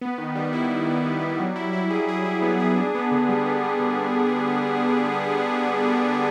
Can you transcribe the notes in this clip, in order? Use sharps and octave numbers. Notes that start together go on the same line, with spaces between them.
B3
D#3
G3
E4
D#3
B3
B3
G3
F#3
E4
E4
G#4
G#4
E4
B3
G#4
D4
B3
D3
G3
B3
G3
D3